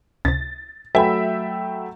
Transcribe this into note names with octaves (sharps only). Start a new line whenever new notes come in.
C#2 C3 A6
F#3 A3 B4 E5 G5 G#5 B5